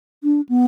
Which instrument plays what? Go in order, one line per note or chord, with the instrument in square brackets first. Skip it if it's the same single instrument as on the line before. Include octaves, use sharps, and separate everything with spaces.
[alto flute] D4
B3